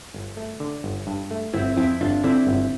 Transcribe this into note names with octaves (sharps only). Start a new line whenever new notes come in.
G1
A3
D3
G1
G2
A3
G1 C4 E4
F2 C4 E4
G1 D4 F4
D3 C4 E4
G1